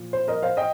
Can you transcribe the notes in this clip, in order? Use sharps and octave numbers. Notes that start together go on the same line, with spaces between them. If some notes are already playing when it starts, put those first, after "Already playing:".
Already playing: A#2 F3
C5
A#4 D#5
C5 F5
D#5 G5